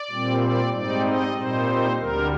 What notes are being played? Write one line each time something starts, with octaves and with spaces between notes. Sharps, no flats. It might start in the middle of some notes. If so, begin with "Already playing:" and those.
Already playing: D5
A#2 G3 C4
D5
G#2 G3 C4 D#4 D5
D#5
A#2 G3 C4 D#4 C5
D2 D3 G3 A#4